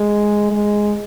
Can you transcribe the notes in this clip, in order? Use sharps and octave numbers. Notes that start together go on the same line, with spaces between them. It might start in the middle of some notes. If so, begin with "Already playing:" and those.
Already playing: G#3
G#3